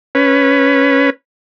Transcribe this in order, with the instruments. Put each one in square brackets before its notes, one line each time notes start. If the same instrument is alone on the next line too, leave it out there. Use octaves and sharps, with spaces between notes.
[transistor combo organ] C#4 B4